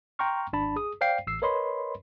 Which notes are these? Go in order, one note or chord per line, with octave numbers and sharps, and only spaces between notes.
G5 A#5 C6 C#6 F6
G#1 D4 A5 B5
G#4 D#6
C5 D5 F5 G5 C7
A1 E6 C7
A#4 B4 C#5 D#5 B5 C6